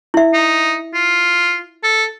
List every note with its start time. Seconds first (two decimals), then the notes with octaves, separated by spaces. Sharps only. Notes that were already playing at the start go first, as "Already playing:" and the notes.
0.14 E4 E5
0.34 D#4
0.94 F4
1.84 A4